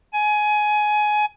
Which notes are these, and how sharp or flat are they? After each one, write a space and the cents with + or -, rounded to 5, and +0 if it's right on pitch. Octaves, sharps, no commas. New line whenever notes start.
G#5 +20